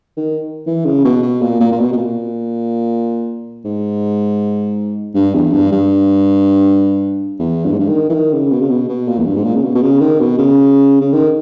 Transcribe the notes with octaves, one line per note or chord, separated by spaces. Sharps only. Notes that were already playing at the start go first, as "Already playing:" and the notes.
D#3
E3
C#3
B2
B2
A#2
A#2
A#2
B2
B2
A#2
G#2
G2
E2
G2
G2
E2
G2
G#2
G2
D#3
E3
D#3
C#3
B2
C#3
B2
B2
A#2
E2
G2
G#2
A#2
C#3
B2
B2
C#3
D#3
B2
C#3
C#3
D#3